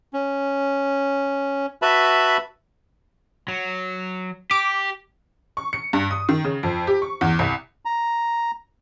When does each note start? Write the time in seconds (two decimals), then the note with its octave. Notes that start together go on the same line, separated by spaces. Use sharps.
0.13 C#4
1.82 F#4 B4 E5 A5 B5
3.48 F#3
4.51 G4 D6
5.57 C#6
5.73 C#7
5.93 G2
6.11 D#6
6.29 D#3
6.44 C#3
6.63 F2
6.87 G4
7.02 C#6
7.21 E2
7.39 C2
7.85 A#5